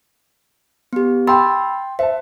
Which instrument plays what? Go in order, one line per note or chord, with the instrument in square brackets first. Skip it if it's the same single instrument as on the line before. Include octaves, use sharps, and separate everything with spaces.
[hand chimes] B3 G4
[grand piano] G5 C6 [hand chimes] B5 E6 A6
[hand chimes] C5 [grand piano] E5 A5